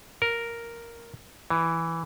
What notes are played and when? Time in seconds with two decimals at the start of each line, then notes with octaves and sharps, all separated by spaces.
0.22 A#4
1.50 E3